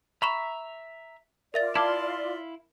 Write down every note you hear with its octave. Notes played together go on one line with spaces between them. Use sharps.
E5 A#5 B5 C#6 E7
F4 A#4 D5 E5 A6
E4 F5 A5 C6 D6 G#6